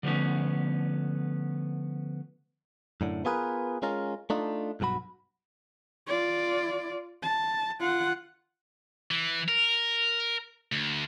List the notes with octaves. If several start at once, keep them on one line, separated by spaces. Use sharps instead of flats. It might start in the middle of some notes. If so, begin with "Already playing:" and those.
D3 F3 A3 B3 C#4
F#2 A2 D3
B3 F4 G#4 A#4 B4
G#3 C#4 F4 A#4
A3 D4 D#4 F4
B1 G2 F#3 F#4 B5
F4 D5
A5
F4 F#5
E3
A#4
D2